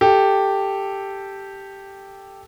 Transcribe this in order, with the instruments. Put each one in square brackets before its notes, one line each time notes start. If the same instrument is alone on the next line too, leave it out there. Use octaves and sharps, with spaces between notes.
[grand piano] G4 A4